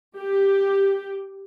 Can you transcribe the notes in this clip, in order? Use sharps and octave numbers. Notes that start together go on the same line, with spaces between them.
G4